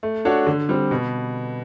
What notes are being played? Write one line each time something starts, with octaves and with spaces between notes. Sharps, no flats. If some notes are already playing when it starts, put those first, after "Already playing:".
A3
D4 F#4 A4 C#5
D3
G3 C4
B2